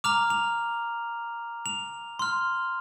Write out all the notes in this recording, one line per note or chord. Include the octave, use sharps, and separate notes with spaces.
A#5 D6 F6 F7
F7
F7
C6 F6